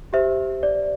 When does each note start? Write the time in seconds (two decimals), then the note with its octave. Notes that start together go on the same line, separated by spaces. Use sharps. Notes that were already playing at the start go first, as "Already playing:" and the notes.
0.13 G4 C5 E5
0.63 D5